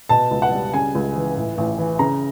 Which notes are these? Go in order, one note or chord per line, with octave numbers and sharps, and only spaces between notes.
B2 A5
C#2
F#5
G3
C#3 G#5
C#2
E3
A2
A1
E3
C#3 A#5